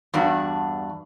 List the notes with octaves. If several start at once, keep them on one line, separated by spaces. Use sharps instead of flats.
E2 G2 D4 F#4